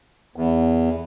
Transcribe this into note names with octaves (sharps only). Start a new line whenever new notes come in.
E2